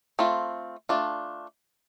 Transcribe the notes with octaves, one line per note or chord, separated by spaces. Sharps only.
A3 C4 F4
A3 D4 F4